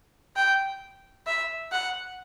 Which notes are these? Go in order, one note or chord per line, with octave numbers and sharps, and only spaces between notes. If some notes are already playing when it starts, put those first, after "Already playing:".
G5
E5
F#5